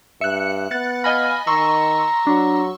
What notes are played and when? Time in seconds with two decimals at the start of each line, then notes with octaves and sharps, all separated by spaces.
0.21 G2 E5 F#6 C#7
0.71 B3 F#6 A6 C#7
1.04 D#5 F5 G#5 B5 A#6
1.47 D#3 A#5 C6 C#6 E6
2.27 F#3 D4